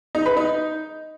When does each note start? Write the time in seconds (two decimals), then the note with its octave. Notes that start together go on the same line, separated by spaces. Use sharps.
0.15 D#4
0.26 B4
0.37 D#4